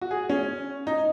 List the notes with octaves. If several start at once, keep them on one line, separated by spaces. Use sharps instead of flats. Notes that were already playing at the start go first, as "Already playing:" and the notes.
F#4
G#4
C#4
D#4